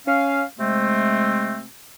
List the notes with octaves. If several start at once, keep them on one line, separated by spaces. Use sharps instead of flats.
C#4 F5
C3 G#3 A3 C4